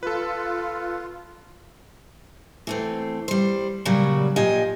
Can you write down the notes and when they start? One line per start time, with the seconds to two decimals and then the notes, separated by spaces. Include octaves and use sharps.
0.03 F4 A4 B4
2.67 E3 A3 C4
3.28 G3 C5
3.85 A#2 C#3 F#3 G3
4.36 A#2 F3 G4 D#5 G#5